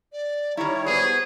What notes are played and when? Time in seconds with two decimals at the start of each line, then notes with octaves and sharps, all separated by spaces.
0.13 D5
0.57 D#3 G3 E4 C#5 A#5
0.86 B3 F#4 G#4 C5